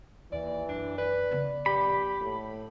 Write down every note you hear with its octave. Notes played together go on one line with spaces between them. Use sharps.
D#2 E3 D5
F#2 D4
B4 D5
C#3 B3
A#1 G4 B5
A2